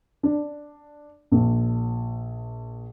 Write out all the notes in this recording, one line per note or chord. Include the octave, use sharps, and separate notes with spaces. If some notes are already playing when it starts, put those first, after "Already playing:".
D4
A#1